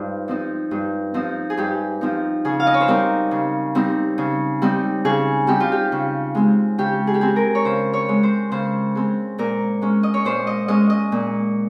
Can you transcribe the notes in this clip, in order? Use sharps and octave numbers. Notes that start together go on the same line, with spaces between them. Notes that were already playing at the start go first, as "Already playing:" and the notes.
Already playing: G2 D#4 F4 C5
F3 C4 D#4
G2
F3 C4 D#4
G#4
G2 G4
F3 C4 D#4
C#3 G#4
F5
D#5
C#5
C5
G3 C4 D#4 A#4
C#3
G3 C4 D#4
C#3
G3 C4 D#4
C#3 G#4
G3 C4 D#4 G4
F4
G4
C#3
G#3 C4
C#3 G4
G#4
G4
G#3 C4 G#4
A#4
C#5
C#3 C5
C#5
G#3 C4
C5
C#3 C5
G#3 C4
A#2 A#4
G#3 C#4
D#5
C#5
A#2 C5
D#5
G#3 C#4 D#5
D#5
A#2